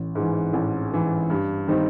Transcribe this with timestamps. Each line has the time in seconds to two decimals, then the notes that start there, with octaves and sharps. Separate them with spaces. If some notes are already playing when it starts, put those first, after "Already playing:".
Already playing: A1
0.15 G#2 E3
0.53 A1
0.92 G#2 E3
1.30 G2
1.68 D#3 G3 C4 D#4